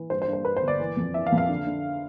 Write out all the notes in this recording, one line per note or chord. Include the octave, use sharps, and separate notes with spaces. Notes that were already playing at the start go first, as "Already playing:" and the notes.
Already playing: E3
G2 C5
C5
G2
C5
G2 B4
C5
G1
D5
E3
F2
E3 E5
F5
F2
F5
D3
D3